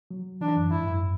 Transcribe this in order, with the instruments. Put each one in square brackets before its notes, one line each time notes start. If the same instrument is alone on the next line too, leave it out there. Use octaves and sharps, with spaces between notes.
[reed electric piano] F#3
[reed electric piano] E3 [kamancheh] D4
[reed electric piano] F#2
[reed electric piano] G#2 [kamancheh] E4
[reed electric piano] F#2